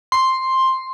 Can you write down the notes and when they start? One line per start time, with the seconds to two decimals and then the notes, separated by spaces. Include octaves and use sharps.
0.12 C6